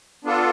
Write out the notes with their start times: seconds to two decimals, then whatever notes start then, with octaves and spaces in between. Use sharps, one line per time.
0.25 B3 D4 F4 A4